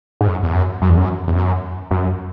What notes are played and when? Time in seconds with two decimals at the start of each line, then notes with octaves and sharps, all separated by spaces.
0.21 G#2
0.27 F#2
0.43 E2
0.54 F#2
0.82 F#2
0.90 E2
0.97 F#2
1.27 E2
1.36 F#2
1.91 F#2